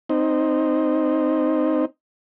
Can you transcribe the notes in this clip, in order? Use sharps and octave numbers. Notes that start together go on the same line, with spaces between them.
C4 D#4